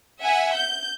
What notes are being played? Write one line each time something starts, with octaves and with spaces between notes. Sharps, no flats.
E5 F#5 G#5
G6